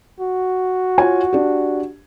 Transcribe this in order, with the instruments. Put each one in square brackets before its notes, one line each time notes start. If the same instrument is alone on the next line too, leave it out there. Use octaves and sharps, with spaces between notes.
[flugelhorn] F#4
[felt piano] F4 C#5 G#5
D4 G4